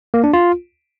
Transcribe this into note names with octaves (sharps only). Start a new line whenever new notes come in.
A#3
D4
F4